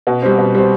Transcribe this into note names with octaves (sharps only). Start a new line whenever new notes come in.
B2
G3 C4
B2
G3 C4